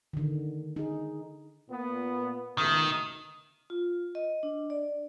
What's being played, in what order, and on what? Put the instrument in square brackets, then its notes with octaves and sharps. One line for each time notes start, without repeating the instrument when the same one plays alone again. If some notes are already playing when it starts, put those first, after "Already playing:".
[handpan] D3 D#3
D#4 G#4
[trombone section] A#2 B3
[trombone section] C#2 B2 A3 [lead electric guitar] D#3
[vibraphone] F4
D#5
D4
D5